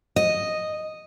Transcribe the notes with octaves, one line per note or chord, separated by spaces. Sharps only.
D#5